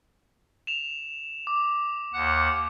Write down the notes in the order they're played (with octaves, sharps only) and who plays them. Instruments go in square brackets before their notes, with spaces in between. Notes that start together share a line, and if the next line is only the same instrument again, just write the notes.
[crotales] E7 F7
D6
[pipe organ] D#2 F#5 F#6